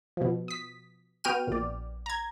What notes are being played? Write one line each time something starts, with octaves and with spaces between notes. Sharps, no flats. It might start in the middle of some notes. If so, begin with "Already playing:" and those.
B2 F3
D#6 B6
B3 F#4 G5 F6 D#7
A#1 D5
A#5 G#6